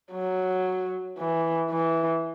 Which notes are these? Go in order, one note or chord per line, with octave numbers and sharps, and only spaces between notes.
F#3
E3
E3